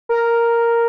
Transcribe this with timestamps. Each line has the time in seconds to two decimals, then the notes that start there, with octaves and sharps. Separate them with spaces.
0.09 A#4